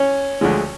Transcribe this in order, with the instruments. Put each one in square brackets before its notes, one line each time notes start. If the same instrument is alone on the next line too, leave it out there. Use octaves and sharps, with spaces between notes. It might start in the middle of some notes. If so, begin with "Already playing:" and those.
Already playing: [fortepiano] C#4
D2 D3 F3 G#3